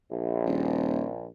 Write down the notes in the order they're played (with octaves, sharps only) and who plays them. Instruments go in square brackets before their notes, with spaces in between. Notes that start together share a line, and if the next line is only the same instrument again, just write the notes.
[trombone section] A#1
[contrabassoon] D#1